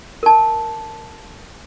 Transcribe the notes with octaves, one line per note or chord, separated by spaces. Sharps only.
A#4 A5